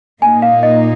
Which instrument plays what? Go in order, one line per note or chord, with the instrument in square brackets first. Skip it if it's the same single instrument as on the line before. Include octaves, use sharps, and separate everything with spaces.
[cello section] A#2 A#3 D#4 [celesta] G#5
[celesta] F5
D#5